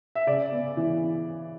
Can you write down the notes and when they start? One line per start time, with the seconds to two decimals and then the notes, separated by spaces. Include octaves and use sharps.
0.15 E5
0.27 C#3 D5
0.52 B3
0.77 E3